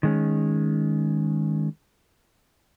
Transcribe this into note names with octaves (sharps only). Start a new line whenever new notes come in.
D#3 G#3 C#4